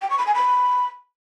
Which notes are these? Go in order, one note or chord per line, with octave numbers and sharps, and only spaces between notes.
G5
C#6
B5
G#5
B5